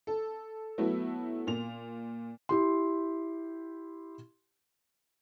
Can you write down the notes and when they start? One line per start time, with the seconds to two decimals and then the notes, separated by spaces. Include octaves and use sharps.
0.07 A4
0.78 F#3 A3 B3 E4
1.47 A#2 F7
2.49 E4 G4 C6